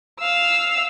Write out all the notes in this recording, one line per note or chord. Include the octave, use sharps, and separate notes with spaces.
F5 E6